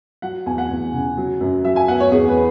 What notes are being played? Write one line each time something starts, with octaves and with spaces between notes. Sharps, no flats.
F#3 F#5
E2 G#5
F#5
E2
C#3
F#3
F#2
F#3 E5
G#5
B3 F#5
C#5
E2 G#4
B4